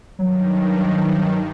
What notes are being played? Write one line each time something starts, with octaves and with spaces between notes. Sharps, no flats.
G2 D#3 F#3